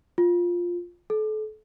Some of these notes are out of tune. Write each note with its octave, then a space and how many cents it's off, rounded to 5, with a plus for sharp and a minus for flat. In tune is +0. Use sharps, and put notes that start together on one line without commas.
F4 +5
A4 -35